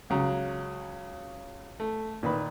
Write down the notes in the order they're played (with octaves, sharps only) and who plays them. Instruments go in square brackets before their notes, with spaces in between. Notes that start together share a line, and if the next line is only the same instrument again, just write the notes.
[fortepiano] C#2 C#3 F#3 A#5
A3
A#2 D#3 B4 B5